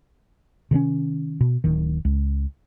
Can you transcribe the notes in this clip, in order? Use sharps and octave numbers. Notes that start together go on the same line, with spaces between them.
C3 D#3 F#3 C#4
B2
D1 D#3
C#2